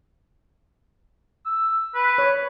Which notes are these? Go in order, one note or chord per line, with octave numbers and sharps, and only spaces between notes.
E6
B4
C#5